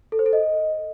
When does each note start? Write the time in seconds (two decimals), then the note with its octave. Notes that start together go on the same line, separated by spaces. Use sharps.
0.12 A4
0.19 C5
0.26 A4
0.33 D#5